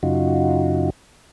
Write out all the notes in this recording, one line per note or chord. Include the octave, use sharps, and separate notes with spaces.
F#2 C#3 D#4 F4 F#4